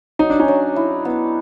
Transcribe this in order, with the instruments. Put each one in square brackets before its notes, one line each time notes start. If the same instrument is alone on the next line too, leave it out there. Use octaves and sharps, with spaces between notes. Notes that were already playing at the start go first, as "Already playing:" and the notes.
[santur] F#3 [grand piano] D#4
[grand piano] D4
C#4 D#4
[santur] F#3
E4
B3